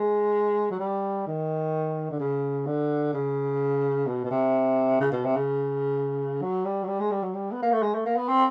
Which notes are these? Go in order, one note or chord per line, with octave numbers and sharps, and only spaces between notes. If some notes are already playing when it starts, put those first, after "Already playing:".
Already playing: G#3
F#3
G3
D#3
D3
C#3
D3
C#3
B2
B2
C3
C#3
B2
C3
C#3
F#3
G3
F#3
G3
G#3
G3
F#3
G3
B3
A#3
A3
G#3
A3
A#3
B3
C4